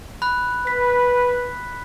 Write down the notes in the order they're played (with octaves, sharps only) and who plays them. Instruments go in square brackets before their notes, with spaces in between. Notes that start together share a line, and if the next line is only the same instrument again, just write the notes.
[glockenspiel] B5 F#6
[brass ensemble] B4 [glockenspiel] B6